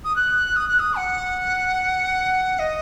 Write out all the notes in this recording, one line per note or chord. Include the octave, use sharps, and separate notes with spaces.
D#6
F#6
D#6
F#6
D#6
F#5
D#5